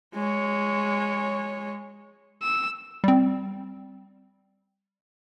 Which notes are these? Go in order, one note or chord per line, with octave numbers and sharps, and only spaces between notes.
G#3 C#5
E6
G3 C4